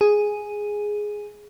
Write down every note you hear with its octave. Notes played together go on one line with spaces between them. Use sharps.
G#4